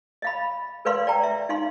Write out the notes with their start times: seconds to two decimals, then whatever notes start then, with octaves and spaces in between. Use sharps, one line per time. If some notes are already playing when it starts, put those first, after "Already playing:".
0.22 D#5 F5 B5
0.85 A#4 B4 D5 F5 C6
1.07 D5 G5 A#5
1.23 E5
1.49 D#4 F5 C6